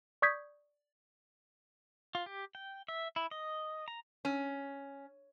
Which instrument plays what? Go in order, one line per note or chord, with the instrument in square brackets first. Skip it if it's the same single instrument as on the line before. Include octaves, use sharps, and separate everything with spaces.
[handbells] D5 C#6 D#6 G6 G#6 B6
[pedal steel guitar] F4
G4
G5
E5
E4
D#5
A#5
[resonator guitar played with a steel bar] C#4